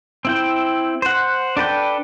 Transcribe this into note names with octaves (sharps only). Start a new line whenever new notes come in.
C4 E4 G5
C5 F#5
D4 A4 B4 G5